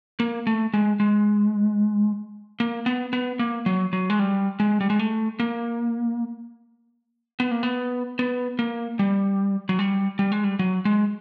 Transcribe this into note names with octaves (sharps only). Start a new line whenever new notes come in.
A#3
A3
G#3
G#3
A#3
B3
B3
A#3
F#3
F#3
G#3
G3
G#3
G3
G#3
A3
A#3
B3
A#3
B3
B3
A#3
G3
F#3
G3
G3
G#3
G3
F#3
G#3